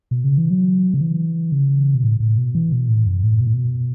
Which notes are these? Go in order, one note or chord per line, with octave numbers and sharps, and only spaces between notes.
B2
C#3
E3
F#3
C#3
E3
C#3
B2
A2
A2
B2
E3
B2
A2
F#2
A2
B2
A2
B2